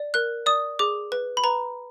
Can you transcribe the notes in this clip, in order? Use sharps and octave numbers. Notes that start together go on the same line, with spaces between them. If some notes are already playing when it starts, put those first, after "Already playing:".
Already playing: D5
A#4 F#6
D5 D#6
G#4 D6
B4
B5
B4 A#5